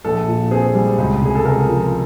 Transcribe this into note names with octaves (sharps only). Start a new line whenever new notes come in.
A#1 A4
A#2
C4 G#4
G3
C#2
C3 G#4
A4
C#2 A#4
F3